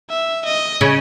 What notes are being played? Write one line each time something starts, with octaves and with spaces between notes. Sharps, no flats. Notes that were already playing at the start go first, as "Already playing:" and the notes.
E5
D#5
C#3